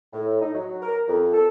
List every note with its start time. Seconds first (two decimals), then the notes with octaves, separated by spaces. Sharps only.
0.13 A2
0.41 D#4
0.55 F#3
0.82 A#4
1.08 F2
1.33 A4